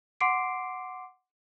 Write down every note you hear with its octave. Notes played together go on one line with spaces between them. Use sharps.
F#5 C6 D6 C7 D7